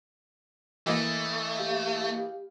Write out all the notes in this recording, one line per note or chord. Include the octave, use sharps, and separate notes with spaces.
E3 A3 A#3 D#5
G4 F5